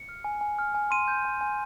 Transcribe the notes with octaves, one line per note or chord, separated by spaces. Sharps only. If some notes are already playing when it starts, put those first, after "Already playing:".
Already playing: C#7
F6
G#5
G#5
F6
G#5
C6 D#7
G6
G#5
G#5